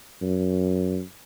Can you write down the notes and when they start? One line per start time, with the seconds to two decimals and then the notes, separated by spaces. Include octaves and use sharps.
0.22 F#2